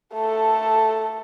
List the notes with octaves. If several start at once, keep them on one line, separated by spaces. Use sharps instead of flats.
A3 A4